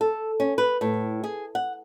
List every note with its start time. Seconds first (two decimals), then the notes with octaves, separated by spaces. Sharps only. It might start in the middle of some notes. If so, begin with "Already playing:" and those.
0.01 A4
0.40 C#4
0.58 B4
0.81 A2
1.24 G#4
1.55 F#5